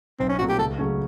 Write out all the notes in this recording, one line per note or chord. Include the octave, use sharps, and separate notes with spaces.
B1 C4
C#4
A#2 F#3 A3 C4 F#4
G4
C#2 A4
C#3 F#3 A3 C#4